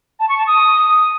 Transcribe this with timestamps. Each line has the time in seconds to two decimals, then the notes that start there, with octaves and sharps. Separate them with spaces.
0.20 A5
0.29 C#6
0.38 A5
0.47 D#6